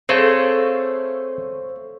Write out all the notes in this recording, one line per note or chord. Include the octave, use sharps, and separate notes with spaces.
A3 C4 G#4 A4 C5 C#5 F5 B5